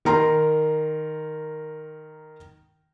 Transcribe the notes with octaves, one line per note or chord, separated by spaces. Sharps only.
D#3 A#4 A#5 C6